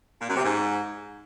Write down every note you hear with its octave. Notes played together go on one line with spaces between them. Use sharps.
A#2
F#2
C3
G#2